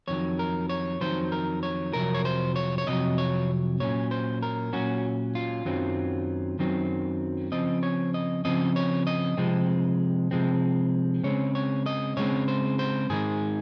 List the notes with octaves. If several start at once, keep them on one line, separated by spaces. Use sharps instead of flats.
F2 D#3 F#3 C#5
A#4
C#5
F2 D#3 F#3 C5
A#4
C#5
F2 C3 F#3 A#4
C#5
C5
C#5
C#5
F2 C3 F#3 D#5
C#5
A#2 F#3 C#4 C#5
C5
A#4
A#2 F#3 C#4 F#4
F4
F#2 D#3 F#3 C4
F#2 D#3 F#3 C4
C#3 F3 C4 D#5
C#5
D#5
C#3 F3 C4 D#5
C#5
D#5
C3 F3 G#3 C4
C3 F3 G#3 C4
C#3 G#3 C4 C#5
C#5
D#5
C#3 G#3 C4 C#5
C5
C5
G#2 D#3 G#3 G#4